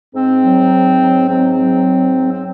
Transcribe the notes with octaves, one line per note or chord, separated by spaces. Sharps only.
G#2 C4
F#3
G#2
F#3
G#2 C4
F#3
G#2
F#3
C4